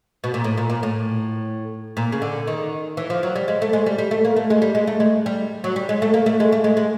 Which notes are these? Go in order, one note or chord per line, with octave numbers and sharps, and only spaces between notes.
B2
A#2
A2
A#2
A#2
A2
A#2
C#3
D3
D#3
E3
F3
F#3
G3
G#3
A3
G#3
G3
G3
A3
A#3
A3
G#3
G3
G#3
A3
G#3
G3
F#3
G3
G#3
A3
A#3
A3
G#3
A3
G#3
G#3